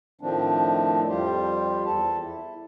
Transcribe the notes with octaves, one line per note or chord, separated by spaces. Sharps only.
A2 D#3 F3 A3 C4 D4
F2 G3 F4 G4 C5
E2 A4 A5
E4